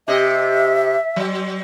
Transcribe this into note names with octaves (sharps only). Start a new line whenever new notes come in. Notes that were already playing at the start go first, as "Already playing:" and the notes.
C3 G4 D#5 E5
F#3